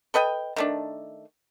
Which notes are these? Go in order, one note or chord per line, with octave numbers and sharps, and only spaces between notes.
A4 B4 D#5 G5
D#3 A3 D4